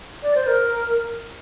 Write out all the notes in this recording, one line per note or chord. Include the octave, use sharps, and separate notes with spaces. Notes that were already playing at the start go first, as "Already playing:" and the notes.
D5
C5
A#4